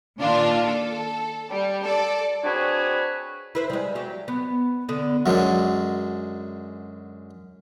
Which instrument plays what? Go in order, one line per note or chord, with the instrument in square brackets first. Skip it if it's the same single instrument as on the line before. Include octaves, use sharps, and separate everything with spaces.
[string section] A#2 D#3 D4 F4
A4
G3
A4 D5
[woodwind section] C4 D4 F#4 G#4 B4 C#5
[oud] E4 B4 C5
G3 G#3
F#3 G4
B3
D3 B3 D4
[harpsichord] F#2 D3 F#3 G#3